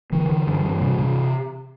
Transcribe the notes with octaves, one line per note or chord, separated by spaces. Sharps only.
D3 E3
D3
G2
G2
C3
C3